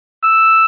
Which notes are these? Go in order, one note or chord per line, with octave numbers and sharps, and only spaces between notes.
E6